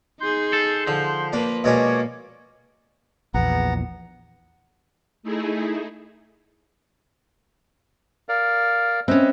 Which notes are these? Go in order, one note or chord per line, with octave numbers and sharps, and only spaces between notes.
D#4 G#4 C6 G6
A4
D3 F3
A#3 D4 B4
B2 G#3 A#3 C#4 C#5 D5
A#1 E2 B3 F#5 A#5
A3 D#4 E4 G#4
A#4 D5 F5
C4 C#4 B4 D#5 E5